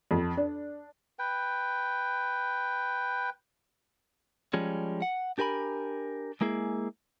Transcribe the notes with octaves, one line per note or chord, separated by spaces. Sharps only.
F2
D4
B4 G5
F3 G3 G#3 C#4
F#5
D4 G4 A#4 G#5 B5
G#3 A#3 E4 G#4